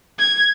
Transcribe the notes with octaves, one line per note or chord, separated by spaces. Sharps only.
G#6